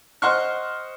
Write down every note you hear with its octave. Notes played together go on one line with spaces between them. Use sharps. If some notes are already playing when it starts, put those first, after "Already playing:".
C5 D#5 F#5 C6 C#6 F6